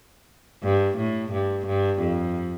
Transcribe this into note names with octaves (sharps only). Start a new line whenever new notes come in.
G2
A2
G2
G2
F2